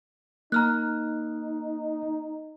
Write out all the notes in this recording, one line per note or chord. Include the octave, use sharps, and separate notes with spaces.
A#3 D#4 A#5 F6 F#6